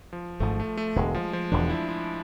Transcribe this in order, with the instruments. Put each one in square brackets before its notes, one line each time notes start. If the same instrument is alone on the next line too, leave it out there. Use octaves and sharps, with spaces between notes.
[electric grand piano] F3
[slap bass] G#1 G#2 F3 [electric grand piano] A3
[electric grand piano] A3
A3
[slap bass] E1 E2 D3 [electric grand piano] G#3
[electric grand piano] F3
F3
[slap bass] E1 E2 D3 [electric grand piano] D4
[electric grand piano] E4
E4